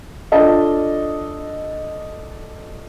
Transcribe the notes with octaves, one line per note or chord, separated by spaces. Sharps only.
D4 F4 A4 D#5 A5